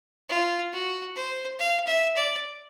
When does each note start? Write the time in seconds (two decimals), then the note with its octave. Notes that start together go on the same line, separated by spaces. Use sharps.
0.29 F4
0.73 F#4
1.16 C5
1.59 F5
1.87 E5
2.17 D5